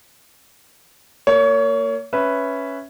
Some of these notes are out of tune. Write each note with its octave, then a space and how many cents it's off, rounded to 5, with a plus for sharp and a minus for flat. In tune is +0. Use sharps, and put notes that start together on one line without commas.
A#3 -20 C#5 +25
C#4 +0 B4 +0 E5 +0